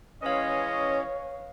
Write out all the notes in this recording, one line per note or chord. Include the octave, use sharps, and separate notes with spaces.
E3 G#3 C#4 B4 C#5 D#5 F5